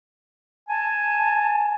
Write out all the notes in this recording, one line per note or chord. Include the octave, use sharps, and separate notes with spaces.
G#5 A5